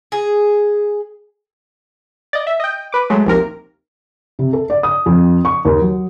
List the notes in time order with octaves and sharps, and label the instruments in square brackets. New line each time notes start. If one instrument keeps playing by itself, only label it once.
[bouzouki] G#4
[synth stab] D5 D#5
E5
D#5 G5
B4 D6
F#3 G#3 A3
A#1 D#2 C3 A#4
[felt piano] C3
A4
D5
D#6
F2
C#6
D#2
F#3